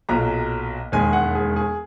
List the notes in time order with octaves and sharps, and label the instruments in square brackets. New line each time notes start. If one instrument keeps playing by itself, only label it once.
[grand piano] B1 A#2 F#3 A#5
E1 D#2 D#3 G#3 G#5
F#5
G#4
G#4